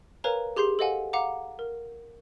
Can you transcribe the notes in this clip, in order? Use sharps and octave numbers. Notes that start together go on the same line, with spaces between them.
A#4 B4 C#5 F5 G#5 A#5
G4 G#4 C6 G6 C7
A4 C5 D#5 F5 F#5 G#5
F5 F#5 A#5 D6
A#4